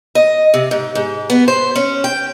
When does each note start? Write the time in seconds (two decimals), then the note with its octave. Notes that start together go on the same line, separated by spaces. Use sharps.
0.15 D#5
0.54 C3
0.71 G#2
0.95 G#2
1.30 B3
1.48 C5
1.76 C#4
2.04 G5